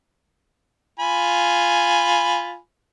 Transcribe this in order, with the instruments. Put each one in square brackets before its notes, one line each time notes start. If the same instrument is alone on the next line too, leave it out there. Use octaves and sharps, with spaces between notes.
[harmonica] F4 G#5 B5